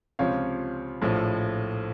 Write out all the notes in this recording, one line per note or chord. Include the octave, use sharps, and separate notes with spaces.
C#2 C3 F3 C#5 F5
A#1 A2 F3